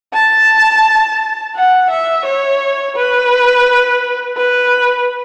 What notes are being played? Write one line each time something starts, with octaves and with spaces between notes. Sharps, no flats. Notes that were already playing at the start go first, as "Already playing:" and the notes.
A5
F#5
E5
C#5
B4
B4